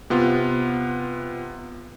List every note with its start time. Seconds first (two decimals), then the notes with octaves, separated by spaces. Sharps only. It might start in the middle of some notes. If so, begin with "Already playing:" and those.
0.10 C3 B3 F4